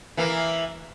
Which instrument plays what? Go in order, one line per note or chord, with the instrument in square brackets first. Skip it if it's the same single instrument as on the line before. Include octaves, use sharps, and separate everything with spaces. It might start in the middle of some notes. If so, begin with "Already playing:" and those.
[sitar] E3 A#3